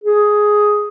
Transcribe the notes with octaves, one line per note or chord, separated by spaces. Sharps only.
G#4